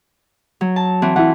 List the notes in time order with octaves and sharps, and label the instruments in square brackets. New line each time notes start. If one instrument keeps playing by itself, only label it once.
[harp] F#3
A5
E3 C4 F#4
[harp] E3 [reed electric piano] E4 F#5